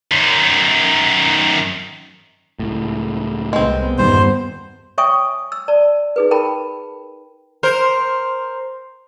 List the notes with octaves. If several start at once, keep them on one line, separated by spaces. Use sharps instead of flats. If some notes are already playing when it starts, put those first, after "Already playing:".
F#2 D#3
C#2 A2
C2 G#3 B3 C4
E2 G2 A#2 D#3 G3 B3 C5
C#5 E5 G5 G#5 C#6 D#6
E6
D5 A5
D#4 G#4 B4
A#4 G5 A5 B5
A#4 C5